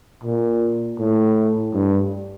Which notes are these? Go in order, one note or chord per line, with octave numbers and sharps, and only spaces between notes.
A#2
A2
G2